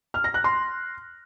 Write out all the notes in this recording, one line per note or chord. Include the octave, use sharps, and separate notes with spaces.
F6
A#6
F#6
C6